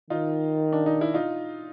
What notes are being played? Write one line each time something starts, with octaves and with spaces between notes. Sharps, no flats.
D#3 D#4 F4
D4
D#4
E4
D#4 F4